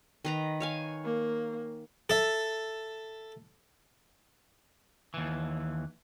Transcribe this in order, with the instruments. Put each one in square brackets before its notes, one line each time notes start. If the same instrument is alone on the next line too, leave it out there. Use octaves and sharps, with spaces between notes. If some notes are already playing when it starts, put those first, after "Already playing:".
[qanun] D#3 B4 A#5
C#5 F5 G#5
[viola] A#3
[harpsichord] A4 E5
[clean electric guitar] D#2 E3